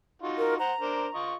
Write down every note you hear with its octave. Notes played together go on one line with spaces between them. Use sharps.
D#4 F4 F#4
A#4
C5 F#5 A#5
D4 A#4 C5
F4 D#5 C#6